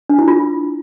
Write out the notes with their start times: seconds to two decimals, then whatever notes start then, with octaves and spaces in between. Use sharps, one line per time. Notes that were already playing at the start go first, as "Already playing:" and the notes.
0.09 D4
0.19 E4
0.28 F4